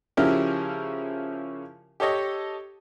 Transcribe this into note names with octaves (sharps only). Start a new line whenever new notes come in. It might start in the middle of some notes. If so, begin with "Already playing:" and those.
C#3 F3 C#4 E4 G4 A#4
G4 A4 C#5 D#5